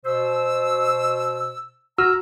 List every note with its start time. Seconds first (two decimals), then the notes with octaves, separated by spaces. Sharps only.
0.05 B2 C5 E6
1.98 F#4 A#5 E6 F6